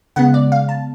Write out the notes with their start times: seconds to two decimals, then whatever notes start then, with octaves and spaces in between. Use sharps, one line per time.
0.16 C#3 G#3 B3 F#5
0.34 D5
0.52 F5
0.69 A5